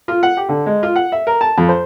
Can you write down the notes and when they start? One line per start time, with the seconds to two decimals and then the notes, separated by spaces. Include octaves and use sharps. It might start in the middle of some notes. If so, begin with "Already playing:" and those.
0.08 F4
0.23 F#5
0.37 G4
0.49 D3
0.66 G#3
0.83 F4
0.96 F#5
1.12 E5
1.27 A#4
1.41 A5
1.58 F2
1.69 C5